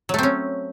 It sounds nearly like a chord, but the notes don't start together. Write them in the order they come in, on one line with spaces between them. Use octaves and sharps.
F#3 A3 C4 C#4